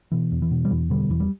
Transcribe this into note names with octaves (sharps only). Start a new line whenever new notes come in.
B2 E3
E2
E3
B2
G3
E2 E3
B2 D3 G3
E2 E3
G3